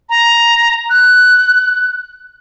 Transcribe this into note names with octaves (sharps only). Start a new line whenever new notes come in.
A#5
F#6